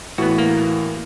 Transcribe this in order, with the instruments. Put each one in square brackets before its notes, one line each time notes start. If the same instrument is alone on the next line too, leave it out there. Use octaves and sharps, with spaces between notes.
[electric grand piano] A2 E3 [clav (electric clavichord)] B3 F#4
[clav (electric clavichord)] A#3